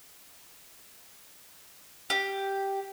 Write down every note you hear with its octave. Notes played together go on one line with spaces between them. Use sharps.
G4